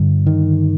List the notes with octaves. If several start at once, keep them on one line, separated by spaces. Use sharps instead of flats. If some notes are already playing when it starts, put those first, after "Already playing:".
Already playing: G2 D3
D#3